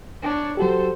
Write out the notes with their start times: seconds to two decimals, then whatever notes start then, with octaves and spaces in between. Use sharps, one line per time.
0.23 D4 C#5
0.57 F#3 F#4 G4 A4 C5